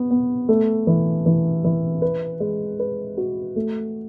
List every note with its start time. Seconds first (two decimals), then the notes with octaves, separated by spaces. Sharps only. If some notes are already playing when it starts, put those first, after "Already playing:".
Already playing: B3
0.11 B3
0.49 A3
0.87 E3
1.26 E3
1.64 E3
2.02 B4
2.40 G#3
2.79 B4
3.17 F#4
3.56 A3